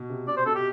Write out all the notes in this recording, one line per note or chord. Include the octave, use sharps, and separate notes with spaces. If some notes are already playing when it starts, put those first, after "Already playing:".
Already playing: B2
C3
B2 D5
C5
B2 A4
G4